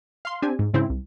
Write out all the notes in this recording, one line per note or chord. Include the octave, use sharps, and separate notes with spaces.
F5 C6
C4 D4 G4 G#5
G#2
G#2 C#3 C4 E4
C2